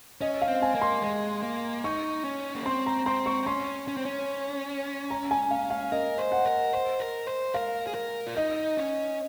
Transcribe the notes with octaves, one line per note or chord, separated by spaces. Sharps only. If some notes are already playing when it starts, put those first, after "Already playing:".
C#4 D#5
F5
C4
G#5
A#3
C6
G#3
A#3
D#4 C#6
C#4
A#3
C4 C6
A#5
C4 C6
C#6
C4
C#4 C6
C#4
C4
C#4
A#5
G#5
F5
F5
A#4 D#5
C5
F#5
A#4
C5
A#4
C5
A#4 F5
G#4
A#4
F4
D#4 D#5
C#4